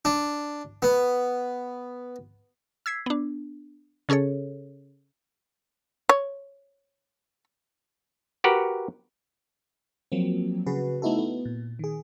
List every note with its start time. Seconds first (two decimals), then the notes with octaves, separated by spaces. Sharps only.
0.05 D4
0.82 B3
2.86 E6 G#6 B6 C7
3.06 B3 D4
4.09 C#3 C#4 G#4 A4 C#5
6.09 C#5
8.44 F#4 G4 A#4 B4 F#5
10.12 F3 F#3 A#3 C4
10.66 C#3 F#4 G#4 B4
11.02 A3 B3 D#4 E4 F#4 A4
11.18 B3
11.45 A#2
11.79 D#3 G#4